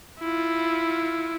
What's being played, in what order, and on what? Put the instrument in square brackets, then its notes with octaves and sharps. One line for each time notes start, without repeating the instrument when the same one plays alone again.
[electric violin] E4 F4